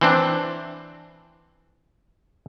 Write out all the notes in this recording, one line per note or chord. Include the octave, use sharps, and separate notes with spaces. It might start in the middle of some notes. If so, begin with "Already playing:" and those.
E3 C4 D4